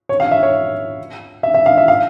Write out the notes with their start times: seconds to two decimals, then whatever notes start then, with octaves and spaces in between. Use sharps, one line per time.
0.09 C#5
0.20 F5
0.31 E5
0.43 C#5
1.43 E5
1.54 E5
1.66 F5
1.77 E5
1.88 F5